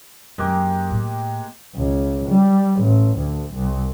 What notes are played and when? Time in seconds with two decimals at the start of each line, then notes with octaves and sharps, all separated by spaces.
0.38 F#2 G#3 A#3 G4
0.91 A2
1.76 C#2
2.30 G3
2.81 A1
3.17 D2
3.54 C2